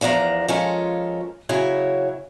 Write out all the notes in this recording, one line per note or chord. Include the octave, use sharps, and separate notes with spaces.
E2 F3 D4 D#5 A#5
F3 G#3 C#4 F4 A4 A#4
C#3 F#3 E4 C#5 G#5